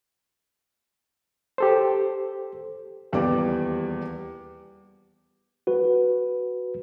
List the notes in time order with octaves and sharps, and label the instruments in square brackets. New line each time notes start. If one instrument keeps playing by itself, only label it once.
[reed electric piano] G4 A4 C5
[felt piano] D#1 E2 G3 B3 D5 D6
[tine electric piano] F#4 B4